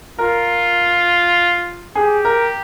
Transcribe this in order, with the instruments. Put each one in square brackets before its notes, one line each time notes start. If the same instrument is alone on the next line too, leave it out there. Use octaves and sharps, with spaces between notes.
[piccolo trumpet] F4 [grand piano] A#4
[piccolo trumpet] G4 [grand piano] G#4
[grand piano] A#4